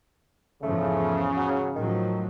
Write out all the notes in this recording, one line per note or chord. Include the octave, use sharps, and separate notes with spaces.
E2 G#2 C#3 F3 A3
F#3
A2 D#3 F3 F#3